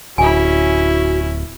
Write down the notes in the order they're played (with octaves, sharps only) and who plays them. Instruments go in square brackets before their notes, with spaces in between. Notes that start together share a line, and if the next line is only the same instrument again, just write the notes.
[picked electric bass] D1 [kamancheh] C#4 E4 [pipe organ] F#4 [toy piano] G#5